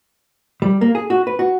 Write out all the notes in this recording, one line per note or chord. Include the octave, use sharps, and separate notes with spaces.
G3
A#3
G#4
F#4
B4
F#4